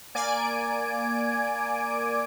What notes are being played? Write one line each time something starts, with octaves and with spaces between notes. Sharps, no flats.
A#3 D5 G#5 D7